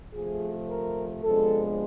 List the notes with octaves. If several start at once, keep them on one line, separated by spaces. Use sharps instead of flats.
C3 F3 A3 G#4
A#4
C3 F3 G#3 B3 D4 A4